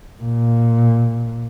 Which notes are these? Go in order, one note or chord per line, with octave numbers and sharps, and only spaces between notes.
A#2